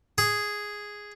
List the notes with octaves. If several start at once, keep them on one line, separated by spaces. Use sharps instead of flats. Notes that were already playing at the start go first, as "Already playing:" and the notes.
G#4